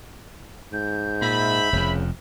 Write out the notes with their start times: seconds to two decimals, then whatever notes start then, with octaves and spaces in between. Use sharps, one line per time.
0.73 G#2 G6
1.22 A#2 E5 B5
1.73 F1 F2 C#3